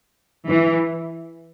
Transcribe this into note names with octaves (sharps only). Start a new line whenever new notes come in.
E3